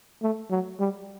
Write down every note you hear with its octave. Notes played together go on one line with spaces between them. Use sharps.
A3
F#3
G3